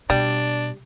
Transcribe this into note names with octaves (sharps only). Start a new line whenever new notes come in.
B2 G3 D4